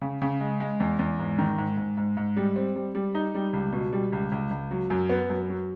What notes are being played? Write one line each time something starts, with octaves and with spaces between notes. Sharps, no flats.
C#3
C#3
G#3
G#3
E2
E2
G#2
D#3
G#2
G#2
G#2
G#2
G3
C4
G3
G3
D#4
G3
C#2
B2
G3
C#2
C#2
C#2
F#3
F#2
B3
F#2
F#3